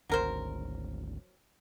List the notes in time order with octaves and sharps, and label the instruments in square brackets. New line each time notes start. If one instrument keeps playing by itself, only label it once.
[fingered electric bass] G#1 D2 [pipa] F#3 A#4 C5